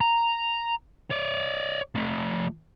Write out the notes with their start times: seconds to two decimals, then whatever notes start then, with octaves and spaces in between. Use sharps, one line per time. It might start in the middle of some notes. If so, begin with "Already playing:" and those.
0.01 A#5
1.10 C#5 D5
1.95 F3 A3